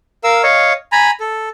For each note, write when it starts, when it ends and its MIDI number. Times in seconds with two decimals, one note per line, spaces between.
0.24 0.43 70
0.24 0.43 77
0.24 0.43 88
0.43 0.73 73
0.43 0.73 75
0.43 0.73 77
0.43 0.73 85
0.92 1.11 80
0.92 1.11 82
0.92 1.11 83
1.20 1.49 69